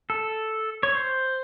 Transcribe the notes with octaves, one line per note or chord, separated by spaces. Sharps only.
A4
C#5
C5